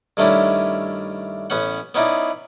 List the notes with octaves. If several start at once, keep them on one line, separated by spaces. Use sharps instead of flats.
G2 D#3 A3 C#4 D4 E4
A1 B3 C#4 F#5
B3 C#4 D#4 E4 D5